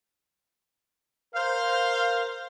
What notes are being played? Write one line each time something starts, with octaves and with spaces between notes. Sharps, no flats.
A#4 C5 F5